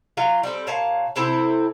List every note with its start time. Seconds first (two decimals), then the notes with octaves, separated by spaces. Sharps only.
0.17 F#3 F4 F5
0.43 G3 C4 A4
0.67 A#2 C#5 F5 A5
1.16 C3 C4 E4 A4